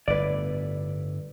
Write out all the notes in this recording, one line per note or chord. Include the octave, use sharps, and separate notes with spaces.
G1 A2 B4 D5